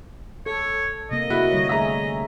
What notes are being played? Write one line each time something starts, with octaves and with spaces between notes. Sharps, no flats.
A4 C#5
C3 A#3 D#5
A#3 E4 F#4
D3 G3 C#5
A3 G#4 D#5 E5 A#5